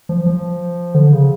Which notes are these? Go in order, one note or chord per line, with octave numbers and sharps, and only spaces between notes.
F3
F3
D3
C#3